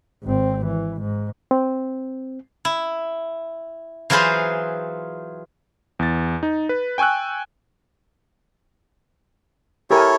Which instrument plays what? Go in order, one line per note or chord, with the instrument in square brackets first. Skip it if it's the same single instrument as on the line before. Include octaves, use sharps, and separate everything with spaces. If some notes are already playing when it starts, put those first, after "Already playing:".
[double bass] G#1 C4
E3
G#2
[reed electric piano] C4
[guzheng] E4
E3 F#3 F4 G#4 B4 C5
[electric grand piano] E2 A6
D#4
B4
G5 G#5 C#6 E6 F#6
[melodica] E4 A4 C#5 [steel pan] G4 A#4 G#5